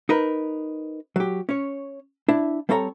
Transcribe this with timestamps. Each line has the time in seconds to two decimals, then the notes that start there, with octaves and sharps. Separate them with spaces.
0.09 D#4 A#4 B4
1.16 F#3 G4
1.49 C#4 C#5
2.29 D4 E4
2.69 G3 C4 A4 C#5 G5 A#5